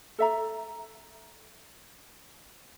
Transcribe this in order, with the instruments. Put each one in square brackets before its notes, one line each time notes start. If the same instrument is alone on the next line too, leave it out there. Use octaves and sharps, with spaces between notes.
[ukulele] A4 E5 A#5